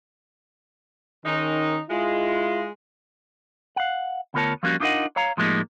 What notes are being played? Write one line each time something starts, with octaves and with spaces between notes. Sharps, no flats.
D#3 G#3 C#4 D#4
G#3 E4 F4
F5 F#5
D2 B3 F4 A#4 C#5 A5
F3 G3 A#3 C#4 F4 F#4
D4 D#4 F4 A#4 D#5 F#5
C#5 F5 A#5
A2 F3 G3 G#3 A#3 D#4